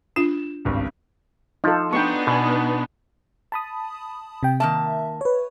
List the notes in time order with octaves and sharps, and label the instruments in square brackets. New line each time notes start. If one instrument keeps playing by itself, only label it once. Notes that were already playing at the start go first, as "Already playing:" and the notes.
[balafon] D4 F4 [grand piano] E7
[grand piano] G#1 C#2 G2
[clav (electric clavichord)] F3 [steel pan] D#4 F4 A4
[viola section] B3 D4 D#4 [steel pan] G5 C6 C#6
[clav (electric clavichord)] B2 [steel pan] B4 G#5
[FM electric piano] A5 B5 D#6
C3 G5
[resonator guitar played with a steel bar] D#3 A#3 A5 [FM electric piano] E5
[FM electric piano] B4 C#5